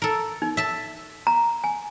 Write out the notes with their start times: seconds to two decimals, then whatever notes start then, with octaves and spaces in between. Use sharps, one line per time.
0.02 A4 A#4
0.42 D#4
0.57 E5 A5
1.27 A#5
1.64 G#5